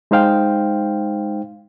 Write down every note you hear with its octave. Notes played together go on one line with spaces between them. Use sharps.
G#3 D#4 C5 F5 G5